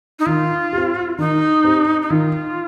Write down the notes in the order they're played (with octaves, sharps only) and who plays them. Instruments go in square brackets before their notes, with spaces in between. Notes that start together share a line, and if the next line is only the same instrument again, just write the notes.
[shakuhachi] D#4
[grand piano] D#3 [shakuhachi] F4
[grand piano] C4 G4
[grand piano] D#3 [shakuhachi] D#4
[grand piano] C4 G4
[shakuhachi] D#4
[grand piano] D#3 [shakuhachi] F4